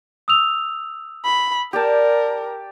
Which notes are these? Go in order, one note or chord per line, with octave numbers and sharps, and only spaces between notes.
D#6 E6 F7
B5
G4 A#4 D5 A5